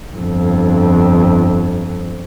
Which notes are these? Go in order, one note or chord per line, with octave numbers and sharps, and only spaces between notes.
G1 F2